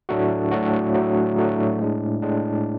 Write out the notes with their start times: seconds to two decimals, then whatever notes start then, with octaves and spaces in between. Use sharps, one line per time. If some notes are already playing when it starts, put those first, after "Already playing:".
0.09 A2 F#3 A3 D4 F#4
0.51 A2 F#3 A3 D4 F#4
0.94 A2 F#3 A3 D4 F#4
1.37 A2 F#3 A3 D4 F#4
1.79 A2 G#3 D4
2.21 A2 G#3 D4